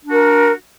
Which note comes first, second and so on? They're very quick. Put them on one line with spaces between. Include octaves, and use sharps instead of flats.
D4 F#4 A#4